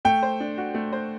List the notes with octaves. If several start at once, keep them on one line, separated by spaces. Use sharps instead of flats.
A3 G5
C5
D4
F#4
A3
C5